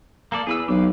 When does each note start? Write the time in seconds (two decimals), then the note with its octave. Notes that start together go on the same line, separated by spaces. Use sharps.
0.32 A#3 A4 D5
0.47 E2 G#4 B4 E6
0.68 B1 G4 B4 F5